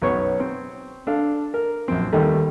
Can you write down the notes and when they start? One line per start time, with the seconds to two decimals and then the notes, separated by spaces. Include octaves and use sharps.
0.02 B1 F#2 B3 C#5 C#6
0.40 C4
1.07 D4 A4 F5
1.54 A#4
1.88 A#1 F#2 C4
2.13 D#2 D#3 G3 A3